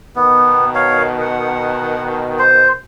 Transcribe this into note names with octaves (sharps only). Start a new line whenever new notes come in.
B2 D#3 B3
C#5 F5
F#5
C5